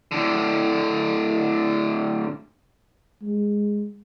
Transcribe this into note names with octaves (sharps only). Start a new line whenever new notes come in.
A2 D3
G#3